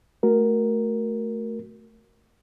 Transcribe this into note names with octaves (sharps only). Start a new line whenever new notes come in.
A3 F#4 A#4